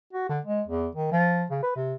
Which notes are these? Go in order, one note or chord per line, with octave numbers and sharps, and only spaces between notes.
F#4
D3
G#3
E2
D#3
F3
C#3
B4
C3